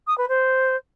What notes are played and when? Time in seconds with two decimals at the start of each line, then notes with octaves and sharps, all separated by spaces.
0.07 D#6
0.17 B4
0.28 C5